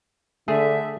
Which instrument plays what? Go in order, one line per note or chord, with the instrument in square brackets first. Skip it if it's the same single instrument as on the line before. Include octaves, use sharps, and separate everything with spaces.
[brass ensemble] D3 [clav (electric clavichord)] A3 G#4 [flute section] E5